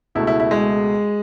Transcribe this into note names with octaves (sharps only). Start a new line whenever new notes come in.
C#2 B2 A3 E4
E4
E4
G#3 G#4